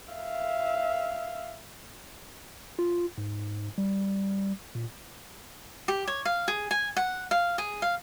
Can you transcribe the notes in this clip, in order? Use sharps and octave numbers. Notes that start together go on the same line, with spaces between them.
E5 F5
F4
G#2
G3
A#2
G4
C#5
F5
G#4
G#5
F#5
F5
G#4
F5